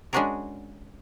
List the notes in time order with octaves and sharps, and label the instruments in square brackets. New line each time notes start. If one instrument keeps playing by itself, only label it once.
[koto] G#3 C#4 D4 F#4 G#4 A#4